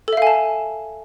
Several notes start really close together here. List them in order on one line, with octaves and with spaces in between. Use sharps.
A4 E5 F5 G#5 A5